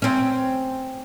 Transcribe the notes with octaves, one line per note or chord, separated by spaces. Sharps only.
C4 C#4